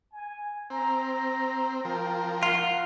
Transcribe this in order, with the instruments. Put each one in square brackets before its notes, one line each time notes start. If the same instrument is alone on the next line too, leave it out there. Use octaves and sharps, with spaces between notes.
[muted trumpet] G#5
[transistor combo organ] C4 [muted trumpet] A#5
[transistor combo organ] F3 A#4 [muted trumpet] G5
[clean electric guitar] F4 [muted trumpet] F#5